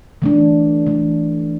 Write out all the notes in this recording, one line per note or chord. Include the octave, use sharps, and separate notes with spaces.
E3 A3 D4
E3 A3 D4